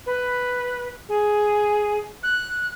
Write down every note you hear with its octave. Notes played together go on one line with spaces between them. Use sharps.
B4
G#4
F#6